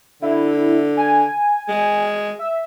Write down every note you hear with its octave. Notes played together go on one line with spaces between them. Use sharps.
D3 E4
G#5
G#3
E5